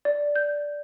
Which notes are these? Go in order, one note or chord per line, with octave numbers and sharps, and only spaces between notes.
D5
G6